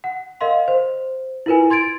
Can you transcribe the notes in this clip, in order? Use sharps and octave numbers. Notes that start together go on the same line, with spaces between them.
F#5
A#4 D#5 F5 C6
C5
E4 F4 A#4 B4 G#5
C6 G#6 A6 D7